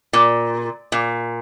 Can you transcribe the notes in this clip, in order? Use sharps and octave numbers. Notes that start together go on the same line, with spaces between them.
A#2
A#2